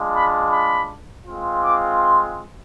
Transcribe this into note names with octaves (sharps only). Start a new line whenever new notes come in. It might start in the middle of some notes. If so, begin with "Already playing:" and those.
Already playing: G#3 D4 F4
B5
B5
G#3 C4 F4
D6
C6